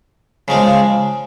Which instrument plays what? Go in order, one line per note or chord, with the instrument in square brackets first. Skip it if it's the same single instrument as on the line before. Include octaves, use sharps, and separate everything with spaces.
[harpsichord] C#3 F3 G#3